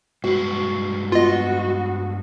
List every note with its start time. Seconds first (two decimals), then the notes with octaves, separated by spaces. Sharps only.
0.24 G2 G#3 F#4 B4
1.12 B3 F4 F#4 D#5